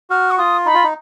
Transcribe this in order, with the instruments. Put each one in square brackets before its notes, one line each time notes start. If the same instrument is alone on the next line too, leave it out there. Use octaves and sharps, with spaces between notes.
[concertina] F#4 [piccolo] F6
[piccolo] C#6
[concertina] F4 [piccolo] D#6
[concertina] D#4 [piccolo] B5
[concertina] F4
D#4